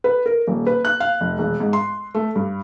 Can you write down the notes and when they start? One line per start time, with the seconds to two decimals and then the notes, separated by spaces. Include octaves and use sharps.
0.04 B4
0.26 A#4
0.47 D#1
0.67 B4
0.85 F#6
1.00 F5
1.21 F1
1.39 E1
1.60 G#2
1.73 C6
2.14 A3
2.36 G2